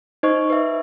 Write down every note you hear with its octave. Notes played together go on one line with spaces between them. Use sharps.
D#4 C5 D#5 C#6
B4 E5